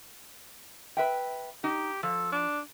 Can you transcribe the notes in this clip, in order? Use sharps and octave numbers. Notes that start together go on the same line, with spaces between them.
B4 E5 G5
D#4 G4
F3 A4
D4